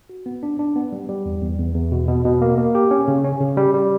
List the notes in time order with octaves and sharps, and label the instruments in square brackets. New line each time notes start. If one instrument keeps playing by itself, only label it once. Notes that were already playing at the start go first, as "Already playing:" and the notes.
[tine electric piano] F#4
B3
D4
D4
B3
G3
G3
E2
E2
E2
E2
B2
B2
B2
A#3
A#3
G4
C#4
C#3
C#4
C#3
G3
G3